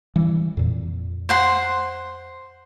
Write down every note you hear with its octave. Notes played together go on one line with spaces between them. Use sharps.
E3 G3
F2 A#2
C5 F#5 C6